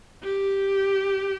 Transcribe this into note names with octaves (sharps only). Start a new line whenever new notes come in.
G4